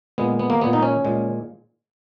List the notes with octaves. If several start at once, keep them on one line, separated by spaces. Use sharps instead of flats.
A#2 G#3 B3
B3
A#3
A#2 G#3 B3
D#4
C#4
A#2 G#3